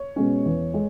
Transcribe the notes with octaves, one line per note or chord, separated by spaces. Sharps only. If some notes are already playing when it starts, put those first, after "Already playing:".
Already playing: C#5
B2 G#3 C#4
E2
G#3